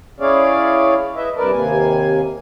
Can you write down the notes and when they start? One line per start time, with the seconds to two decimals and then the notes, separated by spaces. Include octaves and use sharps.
0.20 C#4 E4 G#4 C#5 D5 F5
1.16 E4 B4 D#5 E5
1.37 G2 C3 A#4 B4 D5 A5
1.53 D#2 C3 A#3 G#5